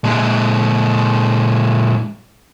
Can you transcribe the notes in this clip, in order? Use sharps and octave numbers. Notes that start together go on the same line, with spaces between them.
A#2 G#3